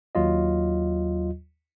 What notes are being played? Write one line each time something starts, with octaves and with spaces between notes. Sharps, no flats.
D#2 F#3 F4 D#5